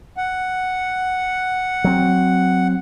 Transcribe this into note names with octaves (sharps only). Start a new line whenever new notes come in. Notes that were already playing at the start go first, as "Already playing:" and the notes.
F#5
F#3 C4